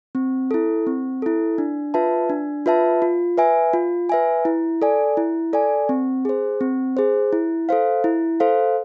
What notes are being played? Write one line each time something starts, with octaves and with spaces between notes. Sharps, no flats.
C4
E4 A4
C4
E4 A4
D4
F4 B4 E5 A5
D4
F4 B4 E5 A5
F4
B4 E5 G#5
F4
B4 E5 G#5
E4
A4 D5 G#5
E4
A4 D5 G#5
C4
G#4 C5
C4
G#4 C5
E4
A4 C5 F5
E4
A4 C5 F5